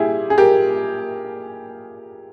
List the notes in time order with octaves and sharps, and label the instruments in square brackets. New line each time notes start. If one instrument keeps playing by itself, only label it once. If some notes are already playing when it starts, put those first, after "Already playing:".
Already playing: [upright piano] A#2 G3 E4 G4 G#4
G#4
G4 A#4